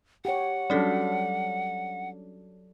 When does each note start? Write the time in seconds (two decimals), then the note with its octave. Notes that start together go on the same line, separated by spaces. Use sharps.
0.25 G4 C#5 F#5
0.70 F#3 G3 C#4 D4 A4 D5